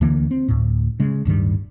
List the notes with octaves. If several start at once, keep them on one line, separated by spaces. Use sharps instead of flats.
D2 D3 E3 A#3
C4
D2 A2
C#3 G#3
D1 G2 D#3 G3